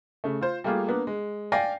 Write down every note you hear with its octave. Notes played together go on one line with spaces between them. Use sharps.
C#3 A3
F4 C5
G3 A3 A#3 F4 G#4
A#3 B3 D4
G#3
D5 F5 G5 G#5 A#6 C7